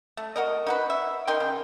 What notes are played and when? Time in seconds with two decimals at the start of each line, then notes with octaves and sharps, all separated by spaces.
0.17 A3
0.36 F#4 A#4 D#5
0.67 D#4 F#4 B4
0.90 E5
1.27 D#4 A#4 G5 C6
1.40 C#3